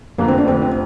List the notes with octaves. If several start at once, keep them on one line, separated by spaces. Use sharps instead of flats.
F1 F2 D3 A#3
C4
D4
F1 F2 D3 C4
C4